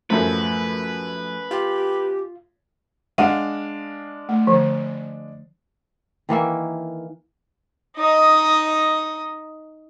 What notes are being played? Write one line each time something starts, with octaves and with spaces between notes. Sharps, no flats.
F#2 A2 F3 A3 B4
F4 G4
G#3 D4 F5 F#5
A3
D3 F3
D#3 E3 A#3 E5
D#4 D#5